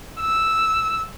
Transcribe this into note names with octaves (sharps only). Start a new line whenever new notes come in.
E6